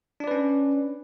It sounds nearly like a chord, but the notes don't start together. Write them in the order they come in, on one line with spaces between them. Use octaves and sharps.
D4 D5 B4 C#4